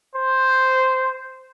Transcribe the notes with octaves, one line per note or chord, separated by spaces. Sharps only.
C5